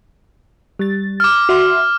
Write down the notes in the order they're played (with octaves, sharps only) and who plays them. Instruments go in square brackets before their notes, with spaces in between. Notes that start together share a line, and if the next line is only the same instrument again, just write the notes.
[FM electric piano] G3 A6
[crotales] D6 F6
[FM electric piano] F#4 E5 C6